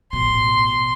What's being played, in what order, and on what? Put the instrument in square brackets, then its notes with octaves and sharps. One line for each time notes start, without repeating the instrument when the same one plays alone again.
[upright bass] A1 B2 [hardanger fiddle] C6